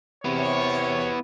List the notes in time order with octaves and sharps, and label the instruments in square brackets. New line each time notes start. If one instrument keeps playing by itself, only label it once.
[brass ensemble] C3 C#5 [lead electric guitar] B3 E4